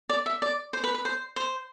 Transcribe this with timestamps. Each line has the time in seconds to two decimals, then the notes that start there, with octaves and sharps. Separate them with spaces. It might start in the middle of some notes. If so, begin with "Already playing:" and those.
0.09 D5
0.26 E5
0.42 D5
0.73 C5
0.84 B4
0.94 B4
1.05 C5
1.36 C5